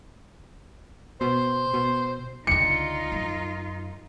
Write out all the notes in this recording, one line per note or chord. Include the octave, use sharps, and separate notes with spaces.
B2 C5
B2
C#2 D3 D#4 F4 C#7
F#2